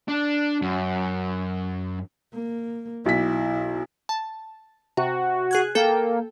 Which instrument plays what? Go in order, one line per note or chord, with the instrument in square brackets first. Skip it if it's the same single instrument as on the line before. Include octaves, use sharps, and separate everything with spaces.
[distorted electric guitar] D4
F#2
[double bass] A#3
[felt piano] B1 B6 [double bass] E4
[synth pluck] A5
[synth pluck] C3 [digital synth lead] F#4
[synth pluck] G#4 F#6 G#6
[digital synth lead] A#3 [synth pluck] A4 G5